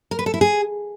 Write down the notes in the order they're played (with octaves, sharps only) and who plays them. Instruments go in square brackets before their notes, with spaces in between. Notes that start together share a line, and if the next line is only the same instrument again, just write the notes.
[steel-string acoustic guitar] A#4
B4
A4
E4
G#4